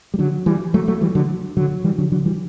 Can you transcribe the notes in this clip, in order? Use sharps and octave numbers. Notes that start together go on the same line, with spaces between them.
G3
D3 F#3
E3 G3
F#3 A3
F#3 A3
E3 G3
D3 F#3
D3 F#3
E3 G3
D3 F#3
D3 F#3
E3 G3